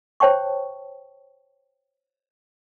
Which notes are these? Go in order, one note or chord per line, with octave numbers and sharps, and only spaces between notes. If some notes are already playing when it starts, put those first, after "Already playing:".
C5 C#5 G5 A5 C#6